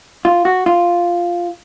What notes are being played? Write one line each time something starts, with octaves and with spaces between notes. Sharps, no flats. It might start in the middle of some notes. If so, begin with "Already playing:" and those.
F4
F#4
F4